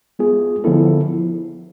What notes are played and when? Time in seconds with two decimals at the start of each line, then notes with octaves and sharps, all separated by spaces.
0.19 G#3 B3 F4 G#4
0.64 D3 F3 B3 E4 A4